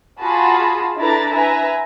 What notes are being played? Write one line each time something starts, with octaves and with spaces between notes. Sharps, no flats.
F4 F#4 G#4 A5 B5
D4 E4 A4 B4 A#5 A6
B4 E5 G#5 A#5